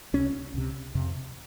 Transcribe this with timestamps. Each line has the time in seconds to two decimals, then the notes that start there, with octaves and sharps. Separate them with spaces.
0.13 C#2 C3 C#4
0.54 C#2 C3
0.95 F2 C3